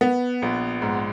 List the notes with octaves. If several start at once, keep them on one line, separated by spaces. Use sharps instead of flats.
B3
A#1
G#2